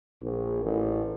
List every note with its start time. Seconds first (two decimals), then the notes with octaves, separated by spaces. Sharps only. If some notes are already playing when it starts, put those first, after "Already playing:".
0.22 A#1
0.64 A1